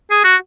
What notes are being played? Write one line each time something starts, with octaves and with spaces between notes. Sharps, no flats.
G#4
F#4